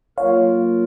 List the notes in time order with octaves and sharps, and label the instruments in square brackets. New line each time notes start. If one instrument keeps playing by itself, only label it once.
[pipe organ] F#3 A#3 F4 A#4 [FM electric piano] C#5 F5